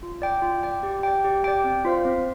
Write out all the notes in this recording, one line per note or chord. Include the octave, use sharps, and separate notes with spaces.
F4
D5 G5
F4
D5 G5
G4
D5 G5
G4
D5 G5
C4
F4 C5 F5
C4